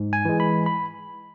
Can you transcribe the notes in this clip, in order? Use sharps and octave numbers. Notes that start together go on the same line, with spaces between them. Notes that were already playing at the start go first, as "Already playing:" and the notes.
Already playing: G#2
G#5
E3 G#3
B5
B5